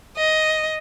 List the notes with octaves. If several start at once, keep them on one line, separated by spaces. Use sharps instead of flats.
D#5